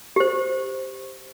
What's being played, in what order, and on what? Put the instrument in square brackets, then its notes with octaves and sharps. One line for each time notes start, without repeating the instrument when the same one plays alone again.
[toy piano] G4 C5